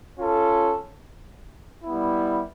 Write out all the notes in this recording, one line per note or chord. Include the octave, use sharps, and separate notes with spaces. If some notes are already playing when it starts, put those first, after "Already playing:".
C#4 F4 A4
G3 B3 E4